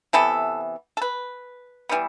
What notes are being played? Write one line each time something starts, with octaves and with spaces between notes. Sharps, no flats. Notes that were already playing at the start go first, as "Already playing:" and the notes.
C3 E3 B3 A4
A4
B4
E3 G3 B3